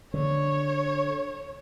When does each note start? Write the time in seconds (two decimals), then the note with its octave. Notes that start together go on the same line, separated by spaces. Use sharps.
0.14 D3 C#5